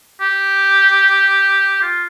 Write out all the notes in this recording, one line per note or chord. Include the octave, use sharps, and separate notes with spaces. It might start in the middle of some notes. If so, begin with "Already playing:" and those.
G4
F4